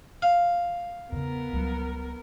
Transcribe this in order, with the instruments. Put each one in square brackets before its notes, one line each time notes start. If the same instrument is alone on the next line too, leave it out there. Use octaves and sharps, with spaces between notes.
[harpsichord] F5
[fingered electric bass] E2 C#3 [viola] B3 A#4
[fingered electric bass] C#2 F#3 G3